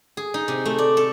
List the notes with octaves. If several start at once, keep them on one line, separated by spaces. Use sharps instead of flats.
G#4
D#4
C3
A3
D5
A4